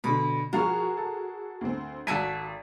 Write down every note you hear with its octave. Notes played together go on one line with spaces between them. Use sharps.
B2 D3 B5
F3 F#4 G#4 A#4 F5 C#6
A4
D2 C4
G#1 F#4 A4 G#5 B6 D#7